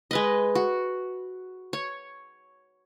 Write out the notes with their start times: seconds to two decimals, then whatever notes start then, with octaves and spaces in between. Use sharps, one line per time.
0.11 G#3 B4 D#5
0.55 F#4
1.73 C#5